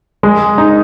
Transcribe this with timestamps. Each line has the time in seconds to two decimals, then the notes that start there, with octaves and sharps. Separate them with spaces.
0.23 G#3
0.58 D#4